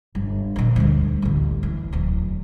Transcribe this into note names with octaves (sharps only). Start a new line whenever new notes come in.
G1
F2 A#2
D2 G3
A1 D2
E3
D1 E2